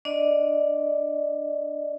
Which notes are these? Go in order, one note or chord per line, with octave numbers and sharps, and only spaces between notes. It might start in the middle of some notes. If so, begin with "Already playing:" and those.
D4 D5 D#5